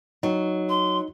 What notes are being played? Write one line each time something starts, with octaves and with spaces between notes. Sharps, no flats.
F#3 D#4
C6